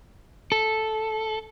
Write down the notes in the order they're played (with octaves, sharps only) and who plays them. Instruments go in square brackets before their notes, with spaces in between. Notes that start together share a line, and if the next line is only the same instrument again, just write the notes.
[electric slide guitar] A4